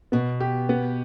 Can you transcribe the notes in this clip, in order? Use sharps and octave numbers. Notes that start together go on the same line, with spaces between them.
B2 B3
G4
B3